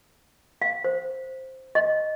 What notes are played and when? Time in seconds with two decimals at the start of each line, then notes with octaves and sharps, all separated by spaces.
0.62 F5
0.84 C5
1.75 D#5